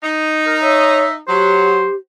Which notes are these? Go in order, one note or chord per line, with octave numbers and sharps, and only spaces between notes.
D#4
A#4
C#5 E5
F#3 G4 C5